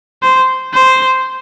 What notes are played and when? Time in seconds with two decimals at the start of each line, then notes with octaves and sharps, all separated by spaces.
0.22 C5
0.74 C5